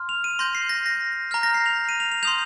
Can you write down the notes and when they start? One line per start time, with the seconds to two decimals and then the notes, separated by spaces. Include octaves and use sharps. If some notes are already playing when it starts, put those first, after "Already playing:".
Already playing: C6 F6
0.09 F7
0.24 D#7
0.39 C6 G6 A#6
0.55 C7
0.69 A#6
0.86 A#6
1.31 F6 G6
1.34 A#5
1.43 A#6
1.54 C7
1.66 F7
1.89 D#7
2.00 F7
2.12 F7
2.23 C6 D#6 G6 F7